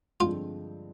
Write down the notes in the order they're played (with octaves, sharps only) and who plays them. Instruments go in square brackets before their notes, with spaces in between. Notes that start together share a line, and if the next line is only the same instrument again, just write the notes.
[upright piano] G2 D3 F3 G#3 C4 [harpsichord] F4